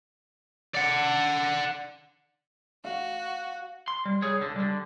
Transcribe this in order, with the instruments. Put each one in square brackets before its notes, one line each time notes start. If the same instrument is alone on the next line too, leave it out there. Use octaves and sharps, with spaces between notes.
[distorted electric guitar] D5 F#5
[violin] F#4 [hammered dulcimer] F5
[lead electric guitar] C6
G3
G#4 C#5
C#2 D3
D3 G3